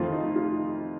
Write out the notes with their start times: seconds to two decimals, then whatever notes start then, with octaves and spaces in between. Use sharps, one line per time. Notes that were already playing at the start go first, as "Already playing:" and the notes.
Already playing: F2 D#3 A3 F4
0.12 D#4
0.35 F4